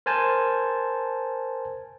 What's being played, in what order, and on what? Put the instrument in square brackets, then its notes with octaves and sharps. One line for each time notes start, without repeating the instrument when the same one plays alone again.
[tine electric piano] A#4 C5 G#5 A5